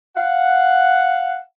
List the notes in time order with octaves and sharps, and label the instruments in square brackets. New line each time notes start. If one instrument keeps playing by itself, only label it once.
[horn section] F5 F#5